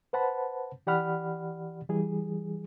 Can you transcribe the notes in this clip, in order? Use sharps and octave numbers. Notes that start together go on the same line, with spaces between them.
B4 C5 F#5 A5 B5
E3 G4 D5 F#5 B5 F6
E3 G3 G#4